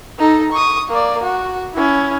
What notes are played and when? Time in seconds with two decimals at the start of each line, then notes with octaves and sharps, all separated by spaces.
0.18 D#4 A4
0.52 C#6 D#6
0.89 A#3 D5
1.23 F#4
1.74 C#4 E4